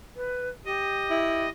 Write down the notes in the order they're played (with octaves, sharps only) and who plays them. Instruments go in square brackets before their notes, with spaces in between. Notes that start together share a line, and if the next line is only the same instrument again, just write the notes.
[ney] B4
[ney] G4 [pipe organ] D#5
[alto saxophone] E4